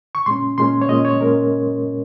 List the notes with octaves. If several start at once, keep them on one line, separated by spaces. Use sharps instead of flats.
C#6
A#2 G#3 C#4 C6
A#2 G#3 C#4 C6
C#5
A#2 G#3 C#4 D#5
C#5
A#2 G#3 C#4 A#4